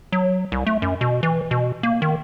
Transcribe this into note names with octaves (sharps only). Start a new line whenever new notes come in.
F#3
C2
A3
F#2
B2
E3
B2
A#3
D#3